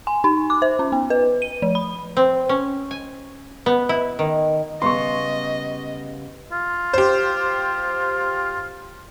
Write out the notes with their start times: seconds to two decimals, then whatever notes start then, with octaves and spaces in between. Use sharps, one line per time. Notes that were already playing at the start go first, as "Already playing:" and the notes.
0.07 G#5
0.24 D#4
0.50 D6
0.62 C5
0.79 C#4
0.92 B3
1.10 B4
1.42 D#7
1.62 F3
1.75 B5
2.17 C4
2.49 C#4
2.91 G#5
3.66 B3
3.89 E4
4.19 D#3
4.82 C#3 G3 B3 D#5 C6 C#6
6.52 F4
6.93 G4 C5